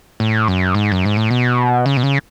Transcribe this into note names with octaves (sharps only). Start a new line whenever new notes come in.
A2
F#2
G#2
F#2
G#2
A2
B2
C#3
B2
C#3